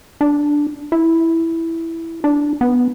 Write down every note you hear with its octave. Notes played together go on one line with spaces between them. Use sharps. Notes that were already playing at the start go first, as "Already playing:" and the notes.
D4
E4
D4
B3